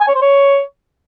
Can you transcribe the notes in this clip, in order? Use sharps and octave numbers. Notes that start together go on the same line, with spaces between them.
G#5
C#5
C5
C#5